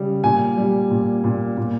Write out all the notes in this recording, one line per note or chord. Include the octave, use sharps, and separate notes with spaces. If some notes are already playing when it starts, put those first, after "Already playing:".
Already playing: C#3 G3
A#2 G#5
G3
A#2
A#2
A#2